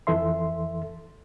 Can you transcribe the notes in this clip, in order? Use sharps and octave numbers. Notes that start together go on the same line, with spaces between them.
F2 E3 A4 E5 C6